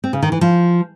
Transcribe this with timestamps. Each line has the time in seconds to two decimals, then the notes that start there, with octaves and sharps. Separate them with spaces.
0.04 C4
0.13 C#3
0.23 D#3
0.32 E3
0.41 F3